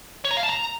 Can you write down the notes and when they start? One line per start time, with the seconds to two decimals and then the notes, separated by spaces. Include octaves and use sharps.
0.25 C#5
0.31 A#5
0.37 F5
0.43 A5
0.49 A#5